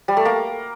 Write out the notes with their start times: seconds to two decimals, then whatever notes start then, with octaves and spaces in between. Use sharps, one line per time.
0.08 G3
0.17 A3
0.25 A#3